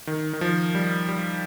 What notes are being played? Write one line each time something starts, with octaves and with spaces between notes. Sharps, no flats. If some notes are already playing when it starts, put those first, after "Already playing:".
D#3
D#3
F3
G3
G3